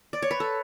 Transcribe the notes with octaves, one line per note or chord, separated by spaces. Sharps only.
D5
C#5
B4
A4